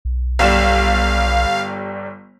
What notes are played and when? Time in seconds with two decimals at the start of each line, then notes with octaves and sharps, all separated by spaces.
0.05 B1
0.39 G1 G3 F5 E7